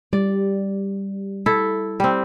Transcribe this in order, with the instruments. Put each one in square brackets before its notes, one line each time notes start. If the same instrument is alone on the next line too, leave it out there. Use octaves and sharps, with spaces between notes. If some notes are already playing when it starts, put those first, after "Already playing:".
[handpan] G3 [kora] D5
[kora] E4 A4
G3 C4